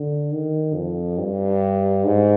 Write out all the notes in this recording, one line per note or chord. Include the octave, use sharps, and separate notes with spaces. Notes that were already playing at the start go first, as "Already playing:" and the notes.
Already playing: D3
D#3
F2
G2
G#2